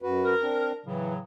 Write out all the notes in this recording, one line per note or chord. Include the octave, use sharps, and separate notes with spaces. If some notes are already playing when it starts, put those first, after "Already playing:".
F#2 F#4 B4
A#4
C4 D4
A2 C#3 E3 F#3